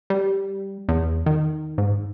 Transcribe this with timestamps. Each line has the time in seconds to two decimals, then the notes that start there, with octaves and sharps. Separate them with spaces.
0.10 G3
0.89 E2
1.26 D#3
1.78 G#2